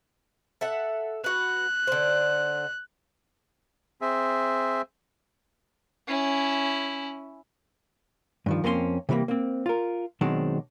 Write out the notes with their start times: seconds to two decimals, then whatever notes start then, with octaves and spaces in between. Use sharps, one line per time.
0.61 A4 E5 F#5
1.24 F#4 B4 F#6
1.87 D3 C5
4.01 C4 G#4 E5
6.08 C#4 E4
8.46 G2 D#3 F3
8.64 F2 A#3 C4 C#4 G#4 C6
9.09 C3 E3 G3 A3 A#3
9.28 A#3 C4
9.66 F4 A#4
10.21 B2 D#3 F#3 G#3 C4 D4